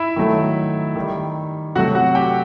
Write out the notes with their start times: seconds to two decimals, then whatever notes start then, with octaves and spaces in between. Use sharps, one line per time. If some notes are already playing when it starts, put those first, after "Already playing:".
Already playing: E4 E5
0.16 D#3 F#3 A3
0.96 D#3 G3
1.75 C3 F#3 A3 F#4 F#5
1.95 F#4 F#5
2.15 G4 G5